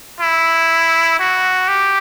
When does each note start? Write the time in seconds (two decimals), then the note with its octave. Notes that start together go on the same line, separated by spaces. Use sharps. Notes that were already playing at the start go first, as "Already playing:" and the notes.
0.21 E4
1.19 F#4
1.68 G4